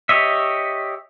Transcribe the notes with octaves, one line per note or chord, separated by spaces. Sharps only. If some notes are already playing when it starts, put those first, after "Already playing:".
G4 C#5 D#5 E5